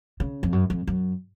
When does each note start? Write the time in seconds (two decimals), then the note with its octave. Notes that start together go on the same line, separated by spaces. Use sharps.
0.20 C#3
0.43 F2
0.53 F#2
0.70 F2
0.87 F#2